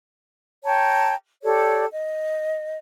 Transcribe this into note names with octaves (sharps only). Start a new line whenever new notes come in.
C#5 G5 A5 A#5
G4 A4 C#5 D5
D#5